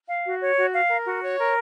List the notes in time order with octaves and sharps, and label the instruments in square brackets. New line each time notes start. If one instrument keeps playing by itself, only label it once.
[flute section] F5
F#4
C#5
F#4
F5
A#4
F#4
C#5
A#4